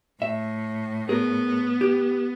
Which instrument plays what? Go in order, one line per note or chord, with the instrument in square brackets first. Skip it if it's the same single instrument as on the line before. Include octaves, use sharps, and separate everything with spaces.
[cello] A2 [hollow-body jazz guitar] E5
[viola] B3 [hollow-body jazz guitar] G#4 A#4
[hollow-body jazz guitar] G4